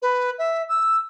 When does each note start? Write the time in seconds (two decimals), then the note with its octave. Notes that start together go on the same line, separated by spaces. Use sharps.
0.02 B4
0.38 E5
0.69 E6